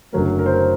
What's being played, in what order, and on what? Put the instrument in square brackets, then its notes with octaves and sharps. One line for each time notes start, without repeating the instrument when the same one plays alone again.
[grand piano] F#1 F#2 D3 F#3 A3 A#4
A#4
C5
A#4